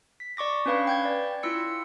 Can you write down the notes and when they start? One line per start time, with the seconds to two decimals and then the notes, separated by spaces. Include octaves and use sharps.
0.20 B6
0.37 D5 C#6 D6 A#6
0.66 C#4 D4 B4 F5 B5
0.87 G5 G6 G#6
1.05 D5
1.43 E4 F4 E6 C#7